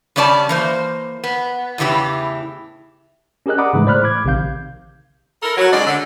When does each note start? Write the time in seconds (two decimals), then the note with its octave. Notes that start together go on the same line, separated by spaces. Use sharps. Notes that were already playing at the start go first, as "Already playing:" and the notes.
0.16 C#3 G3 C#4 D5 G#5 A5
0.49 E3 A#3 C5
1.24 B3
1.78 E2 A2 C#3 E3 G4
3.46 C#4 G4 G#4 A#4 D#5 F#6
3.58 D5 F#5 A#5 B5 D6 D#6
3.73 G#2 C#3 E3 G#3 A3
3.86 A2 C5 D5 B5 F6 F#6
4.04 D6 G#6
4.25 A#1 C3 D#3 F5 G6
5.43 E4 A4 A#4
5.57 F#3
5.72 C#3 G#3 D#4 D5
5.86 D3